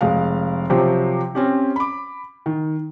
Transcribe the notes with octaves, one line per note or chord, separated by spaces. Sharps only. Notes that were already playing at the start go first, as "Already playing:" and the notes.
F1 G#3 F5
C3 F3 F#3 G4 C5
C4 C#4 G4
B5 D6
D#3